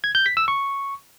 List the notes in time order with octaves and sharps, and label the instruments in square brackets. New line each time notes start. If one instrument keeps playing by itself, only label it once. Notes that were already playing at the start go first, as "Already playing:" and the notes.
[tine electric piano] G#6
G6
B6
E6
C#6